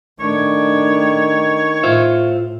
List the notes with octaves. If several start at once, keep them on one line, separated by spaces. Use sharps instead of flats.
D#3 A3 D4 C#5
A2 F4 C5 E5